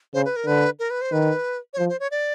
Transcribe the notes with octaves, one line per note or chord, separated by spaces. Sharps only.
C#3 C5
B4
A#4
D3 B4
A#4
B4
C5
D#3 B4
C#5
F3 C5
C5
C#5
D5